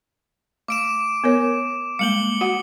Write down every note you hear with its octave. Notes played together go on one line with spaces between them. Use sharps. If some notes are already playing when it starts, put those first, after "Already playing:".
A3 D6 D7 E7
B3 A#4 C#5
G3 G#3 A#3 C#7 F#7 G7
F#4 F#5